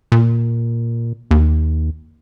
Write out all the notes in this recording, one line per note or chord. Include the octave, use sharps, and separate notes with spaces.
A#2
D#2